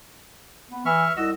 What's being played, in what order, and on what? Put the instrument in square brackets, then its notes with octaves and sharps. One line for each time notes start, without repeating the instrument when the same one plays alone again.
[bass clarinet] B3
[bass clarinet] E3 [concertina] E5 C#6 F6
[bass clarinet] C2 [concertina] F#4 D#5 E6